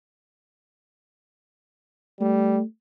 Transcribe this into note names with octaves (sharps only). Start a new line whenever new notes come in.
G3 A3